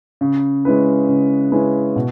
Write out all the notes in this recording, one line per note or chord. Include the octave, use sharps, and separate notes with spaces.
C#3
G#3 C#4 E4 B4
C#3
G#3 C#4 E4 B4
B2